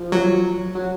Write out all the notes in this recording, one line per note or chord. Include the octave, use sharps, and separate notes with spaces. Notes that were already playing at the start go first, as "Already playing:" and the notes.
Already playing: F3
F#3
F#3